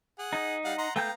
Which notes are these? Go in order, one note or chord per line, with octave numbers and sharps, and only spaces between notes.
G#4 F#5
D#4
G3 F5 F#5
F#5 A#5 C6
A3 B3 F5 G5 A#5 G6